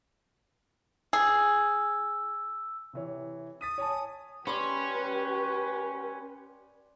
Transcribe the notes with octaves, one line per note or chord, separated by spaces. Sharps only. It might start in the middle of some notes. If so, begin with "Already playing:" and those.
G#4 E6
C3 E3 C#5
D#6 A6 B6 D#7
C#5 G#5 A5
C#4 G4 B4 D5 B5 C6